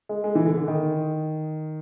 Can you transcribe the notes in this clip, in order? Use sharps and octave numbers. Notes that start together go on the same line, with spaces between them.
G#3
G#3
E3
D3
D3
D#3